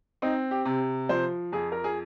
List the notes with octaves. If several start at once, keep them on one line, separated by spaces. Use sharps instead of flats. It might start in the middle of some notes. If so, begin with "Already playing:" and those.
C4 D#4
G4
C3
F3 C5
F2 G#4
A#4
G#4